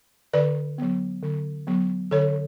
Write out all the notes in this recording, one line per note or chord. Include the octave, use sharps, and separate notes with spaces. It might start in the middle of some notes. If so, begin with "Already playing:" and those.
D3 B4 D5
F#3 B3
D3
F#3 B3
D3 A4 C#5